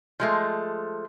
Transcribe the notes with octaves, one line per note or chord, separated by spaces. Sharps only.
F3 G#3 A3